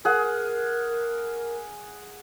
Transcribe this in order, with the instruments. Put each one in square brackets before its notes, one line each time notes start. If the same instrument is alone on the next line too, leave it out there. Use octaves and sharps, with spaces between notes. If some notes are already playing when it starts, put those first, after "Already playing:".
[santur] G#4 F#5 [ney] A#4